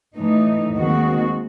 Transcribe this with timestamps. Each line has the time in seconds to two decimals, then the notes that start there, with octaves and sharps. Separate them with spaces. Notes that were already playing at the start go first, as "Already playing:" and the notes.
0.17 A2 E3 A3 D#4
0.76 D#2 D#3 G#3 C4 F#4